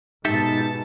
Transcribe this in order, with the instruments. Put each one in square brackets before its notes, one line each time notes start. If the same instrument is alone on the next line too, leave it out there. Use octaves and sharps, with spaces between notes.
[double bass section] G#2 B2 [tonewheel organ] D#4 [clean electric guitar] G4 A4 E5 [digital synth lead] A5